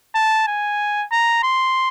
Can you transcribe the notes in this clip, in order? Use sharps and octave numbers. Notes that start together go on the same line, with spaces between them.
A5
G#5
A#5
C6